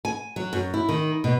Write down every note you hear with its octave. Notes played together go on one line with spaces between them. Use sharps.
G#5
F#3
F#2
E4
D#3
B2